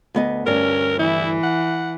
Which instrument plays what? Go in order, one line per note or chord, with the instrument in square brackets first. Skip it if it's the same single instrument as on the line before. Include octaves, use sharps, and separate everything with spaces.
[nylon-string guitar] D2 B3 D#5
[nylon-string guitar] D2 G2 D5 [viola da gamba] C#4 [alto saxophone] A#4
[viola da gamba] E3 [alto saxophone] E4
[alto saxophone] F#5